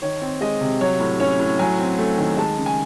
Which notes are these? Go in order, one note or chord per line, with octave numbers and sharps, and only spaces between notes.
D#3 C#5
C4
G#3 D#5
C3
F#3 C#5
A2
C#4 C#5
A2
F#3 G#5
C4
A3
D#3
G#3 A5
C#3
G#5